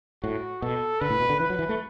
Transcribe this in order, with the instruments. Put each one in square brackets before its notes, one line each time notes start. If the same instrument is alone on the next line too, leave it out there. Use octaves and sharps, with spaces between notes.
[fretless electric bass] A2 [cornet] F#4
[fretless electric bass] B2 [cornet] A4
[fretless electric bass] D3 [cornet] B4
[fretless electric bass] A2
B2
D3
[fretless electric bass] E3 [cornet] B4
[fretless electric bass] F#3
E3
A3